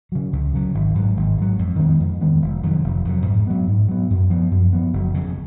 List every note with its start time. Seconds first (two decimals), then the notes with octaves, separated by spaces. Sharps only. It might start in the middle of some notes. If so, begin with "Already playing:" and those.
0.12 C#3 F#3
0.33 C#2
0.53 C#3 F#3
0.74 G#1
0.95 G#2 F#3
1.17 G#1
1.38 G#2 F#3
1.59 F2
1.79 D#3 G#3 B3
2.00 F2
2.21 D#3 G#3 B3
2.42 F1
2.63 F2 D#3 F#3
2.84 F1
3.05 F2 D#3 F#3
3.26 G#2
3.47 F#3 B3
3.68 G#2
3.89 F#3 B3
4.10 F#2
4.30 F3 B3
4.51 F#2
4.73 F3 B3
4.93 F#1
5.14 F2 C#3